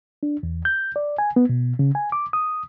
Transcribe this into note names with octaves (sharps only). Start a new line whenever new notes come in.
D4
E2
G6
D5
G#5
B3
B2
C#3
G#5
D6
D#6